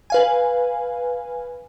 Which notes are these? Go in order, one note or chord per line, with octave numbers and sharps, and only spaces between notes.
B4 F5 G#5